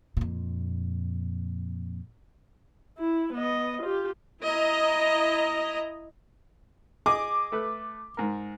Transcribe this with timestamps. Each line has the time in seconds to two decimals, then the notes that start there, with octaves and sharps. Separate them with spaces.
0.17 F2 A#2
2.98 E4
3.33 B3 D#5
3.82 F4 G4
4.43 E4 D#5 A#5
7.06 G#4 D#5 D6
7.52 A3 A4 B4
8.17 G#2 A#4